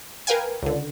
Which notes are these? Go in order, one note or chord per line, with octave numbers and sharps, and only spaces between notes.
A#4 B4 F5 G5 G#5
C#2 D3